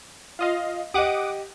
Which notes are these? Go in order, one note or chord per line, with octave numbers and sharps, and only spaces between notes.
F4 D#5 F5
G4 D#5 F#5 D6 D#6